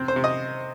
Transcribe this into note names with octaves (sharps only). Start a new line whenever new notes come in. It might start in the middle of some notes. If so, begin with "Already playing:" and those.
Already playing: C3 C4
C5
C3
D#5